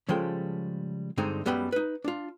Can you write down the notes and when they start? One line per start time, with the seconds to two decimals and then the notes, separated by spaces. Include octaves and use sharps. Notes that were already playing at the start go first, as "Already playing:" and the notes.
0.09 C#3 F3 G3 G#3 A4 G5
1.18 G2 D3 G#3 C4 D#4
1.46 F#2 G3 G#3 B3 G5 B5
1.72 D#4 B4
2.04 D4 F4